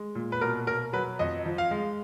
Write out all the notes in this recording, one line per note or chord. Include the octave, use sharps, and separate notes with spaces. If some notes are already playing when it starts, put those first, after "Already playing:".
Already playing: G#3
A#2
B4
B2 A#4
B2 A#4
F#3 B4
F2 D#5
F3
F5
G#3